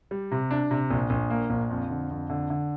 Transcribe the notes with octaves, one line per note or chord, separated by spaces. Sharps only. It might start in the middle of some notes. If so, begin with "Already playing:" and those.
G3
C3
D4
C3
A#1
A#1
A#3
A#1
F2
D3
F2
D3
D3